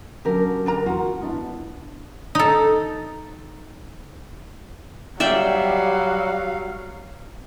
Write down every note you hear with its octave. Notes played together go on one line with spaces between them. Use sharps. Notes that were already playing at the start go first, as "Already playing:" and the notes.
D3 F#3 C#4 G4 A#4
D4 A#4 A#5
E3 F4 F#4
B3 D4 E4
D#4 A4
F#3 G3 D5 E5 F5 G5